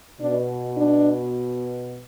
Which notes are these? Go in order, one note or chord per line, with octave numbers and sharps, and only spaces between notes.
B2 D4
D4